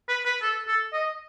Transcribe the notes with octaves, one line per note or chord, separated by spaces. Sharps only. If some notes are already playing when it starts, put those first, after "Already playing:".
B4
B4
A4
A4
D#5